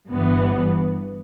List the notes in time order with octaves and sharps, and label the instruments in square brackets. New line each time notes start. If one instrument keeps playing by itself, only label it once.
[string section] G1 G2 E3 B3